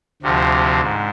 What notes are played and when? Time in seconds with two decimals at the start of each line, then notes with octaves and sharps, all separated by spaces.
0.22 D2 C3 F3
0.82 G#2